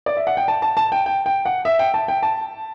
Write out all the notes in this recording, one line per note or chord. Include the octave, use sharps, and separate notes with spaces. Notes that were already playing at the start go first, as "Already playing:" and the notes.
D5
E5
F#5
G5
A5
A5
A5
G5
G5
G5
F#5
E5
G5
A5
G5
A5